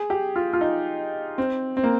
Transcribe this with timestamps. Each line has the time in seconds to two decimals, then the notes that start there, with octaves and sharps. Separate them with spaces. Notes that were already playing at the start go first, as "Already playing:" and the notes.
Already playing: G#4
0.10 G4
0.36 F4
0.53 F4
0.61 D#4
1.38 C4
1.77 C4
1.84 A#3